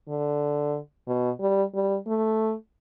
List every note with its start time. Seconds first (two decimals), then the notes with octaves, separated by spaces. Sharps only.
0.08 D3
1.07 B2
1.40 G3
1.74 G3
2.07 A3